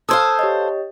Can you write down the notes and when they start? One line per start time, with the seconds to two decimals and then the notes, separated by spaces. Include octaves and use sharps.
0.09 A4 C5 F5 D#6 E6 G#6
0.39 G4 C#5 D#5